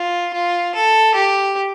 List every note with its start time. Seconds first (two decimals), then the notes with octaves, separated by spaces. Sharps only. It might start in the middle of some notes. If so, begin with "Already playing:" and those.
Already playing: F4
0.34 F4
0.75 A4
1.15 G4